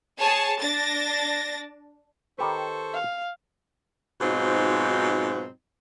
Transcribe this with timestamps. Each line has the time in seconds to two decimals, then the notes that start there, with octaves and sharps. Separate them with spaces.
0.19 G#4 C#5 A5
0.61 D4 A6 A#6
2.38 D#3 G4 A4 B4 C5 C#6
2.94 F5
4.21 G#2 B2 F#3 C4 D#4 F4